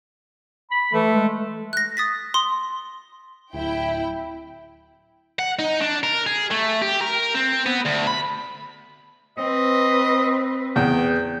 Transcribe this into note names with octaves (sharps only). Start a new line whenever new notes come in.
B5
E3 A3
G#3
F#6 A#6
D#6 A6 B6
C6 D#6
D1 E4 G5
F#5
D#4
D4
A#4
G#4
A3
G4
A#4
C4
B3
D2
B5
C4 B4 D#5
E2 G5